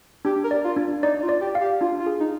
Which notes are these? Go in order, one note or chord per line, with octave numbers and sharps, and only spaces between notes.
D4 G4
A#4
D5
F4
D4
D#4 D5
F4
D5
G4
F5
G4
D4 F4
F4
G#4
D#4